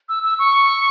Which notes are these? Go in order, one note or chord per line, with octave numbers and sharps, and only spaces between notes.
E6
E6
C#6